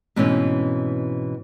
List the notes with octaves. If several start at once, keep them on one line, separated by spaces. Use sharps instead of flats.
G#2 B2 E3 A3 C4 C#4